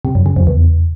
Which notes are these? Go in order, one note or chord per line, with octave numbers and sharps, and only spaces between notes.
C3
F#2
C#3
F2
E2